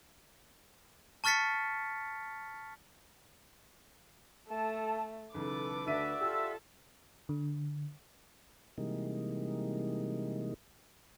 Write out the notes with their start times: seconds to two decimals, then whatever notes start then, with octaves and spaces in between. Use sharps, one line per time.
1.24 A5 C#6 F6 A6 B6 C#7
4.49 A3 A4 A5
5.34 B1 C#3 E3 A4 B4 D6
5.87 D2 D4 F#4 D5 E5 D#7
6.21 F4 G4 A4 E6
7.29 D3
8.78 C3 E3 G3 G#3 A#3 D#4